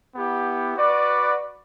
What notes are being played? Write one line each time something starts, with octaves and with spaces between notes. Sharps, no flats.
B3 E4 G4
F#4 B4 D5